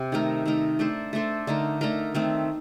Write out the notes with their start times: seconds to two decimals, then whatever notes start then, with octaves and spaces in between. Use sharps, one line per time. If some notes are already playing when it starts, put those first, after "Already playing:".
Already playing: C3
0.12 D#3 A3 D#4 A#4
0.46 D#3 A3 D#4 A#4
0.79 A3 D4 A4 C5
1.13 A3 D4 A4 C5
1.47 D3 A3 D#4 A#4
1.81 D3 A3 D#4 A#4
2.15 D#3 A3 C4